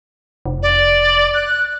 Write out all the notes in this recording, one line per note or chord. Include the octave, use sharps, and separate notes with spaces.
F1
D5
F#6